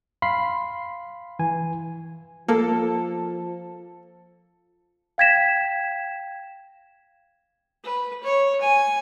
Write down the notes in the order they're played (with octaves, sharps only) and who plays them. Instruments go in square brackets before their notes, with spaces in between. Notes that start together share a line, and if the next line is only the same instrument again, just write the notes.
[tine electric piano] F5 B5 C6 B6 C7
E3 G#5
[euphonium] F3 [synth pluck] A#3 [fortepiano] A4
[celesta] F5 G5 G#6 A#6 B6 E7
[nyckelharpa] B4
C#5
G#5